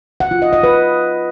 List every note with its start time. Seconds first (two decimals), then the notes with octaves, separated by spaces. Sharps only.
0.20 F#5
0.31 F4
0.42 D#5
0.53 D#5
0.63 B4